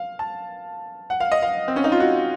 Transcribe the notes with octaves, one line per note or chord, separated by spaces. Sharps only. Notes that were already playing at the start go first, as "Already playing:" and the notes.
Already playing: F5
A5
F#5
F5
D#5
F5
C4
C#4
D#4
F4
F#4